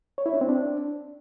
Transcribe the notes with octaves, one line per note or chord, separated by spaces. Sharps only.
C#5
E4
D4
C4
D4